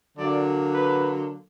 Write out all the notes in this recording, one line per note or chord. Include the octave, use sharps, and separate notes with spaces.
D3 F#3 A#3 D5
B4